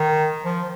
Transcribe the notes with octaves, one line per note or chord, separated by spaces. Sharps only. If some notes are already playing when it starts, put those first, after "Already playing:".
Already playing: D#3
F3